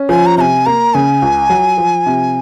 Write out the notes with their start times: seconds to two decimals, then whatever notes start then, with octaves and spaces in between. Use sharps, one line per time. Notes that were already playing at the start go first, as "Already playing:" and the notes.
Already playing: C#4
0.09 F3 G#5
0.26 A#5
0.38 C3 G#5 A#5
0.66 A#3 A#5
0.94 C#3 G#5
1.22 C#2
1.50 F#3
1.78 F3
2.06 C3